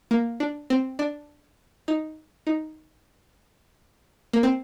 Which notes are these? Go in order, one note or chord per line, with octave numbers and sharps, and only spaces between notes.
A#3
D4
C4
D4
D#4
D#4
A#3
C4